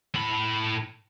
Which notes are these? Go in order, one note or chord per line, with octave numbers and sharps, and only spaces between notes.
A2 B5